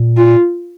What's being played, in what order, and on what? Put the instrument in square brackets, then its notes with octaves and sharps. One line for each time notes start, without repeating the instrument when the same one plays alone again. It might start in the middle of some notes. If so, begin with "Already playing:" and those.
Already playing: [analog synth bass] A#2
[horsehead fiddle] F4